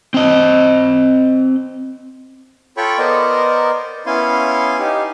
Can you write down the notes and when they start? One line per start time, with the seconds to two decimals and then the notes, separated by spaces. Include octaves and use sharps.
0.14 C4 D#5
2.77 F4 A4 C#5 G5 B5 C#6
2.98 B3 A#4 C5 D5 D#5
4.06 B3 C#4 E4 F5 G#5 C6
4.79 D#4 G4